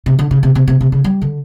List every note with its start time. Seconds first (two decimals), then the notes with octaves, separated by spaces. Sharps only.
0.06 C3
0.19 D3
0.31 C#3
0.43 C3
0.55 C3
0.68 C3
0.81 C3
0.92 C#3
1.04 G3
1.22 D3